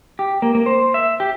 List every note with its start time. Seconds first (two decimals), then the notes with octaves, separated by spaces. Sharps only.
0.19 G4
0.42 A#3
0.55 A#3
0.66 C5
0.94 E5
1.20 G4